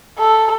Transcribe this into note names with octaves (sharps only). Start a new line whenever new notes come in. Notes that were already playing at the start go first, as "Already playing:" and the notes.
A4